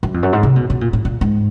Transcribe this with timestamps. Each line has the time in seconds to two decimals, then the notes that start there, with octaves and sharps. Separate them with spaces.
0.03 F#2
0.14 F2
0.23 F#2
0.33 G#2
0.43 C3
0.56 B2
0.70 B2
0.81 A#2
0.93 A2
1.05 A#2
1.21 G#2